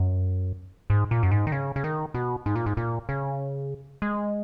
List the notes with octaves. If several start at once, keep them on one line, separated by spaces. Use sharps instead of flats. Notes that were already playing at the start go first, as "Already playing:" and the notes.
Already playing: F#2
G#2
A#2
F#2
G#2
D#3
C#3
C#3
D#3
B2
G#2
A#2
G#2
A#2
C#3
G#3